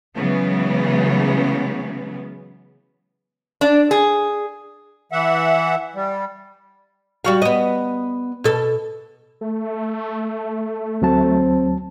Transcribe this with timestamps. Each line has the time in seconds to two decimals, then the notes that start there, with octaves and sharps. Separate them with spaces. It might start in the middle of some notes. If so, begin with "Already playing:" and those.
0.16 C#3 E3 F#3 G#3 B3
3.61 D4
3.91 G#4
5.12 E3 E5 F#5
5.95 G3
7.25 G3 F#4 F5
7.42 B3 D#5
8.44 B2 A4
9.41 A3
11.02 D2 F#3 C4 A5